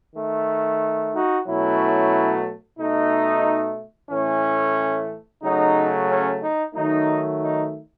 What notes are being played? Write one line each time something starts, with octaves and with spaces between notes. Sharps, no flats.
D#3 A3
D#4 F#4
B2 F#3 A3 C#4 E4
B2 A3 D#4
A2 E3 A3 C#4
C#3 F#3 A3 D#4
C#4
D#4
D#3 F#3 A3 D#4
D#4